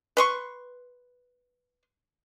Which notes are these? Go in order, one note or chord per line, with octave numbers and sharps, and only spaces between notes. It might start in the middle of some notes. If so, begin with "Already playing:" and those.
B4 C6 C#6